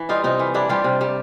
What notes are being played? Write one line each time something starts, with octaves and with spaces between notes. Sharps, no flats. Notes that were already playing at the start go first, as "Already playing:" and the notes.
Already playing: E3
G3 D#4 F4
C3 D#4 F4
E3
G3 D4 E4
G3 F4 G4
C3
G3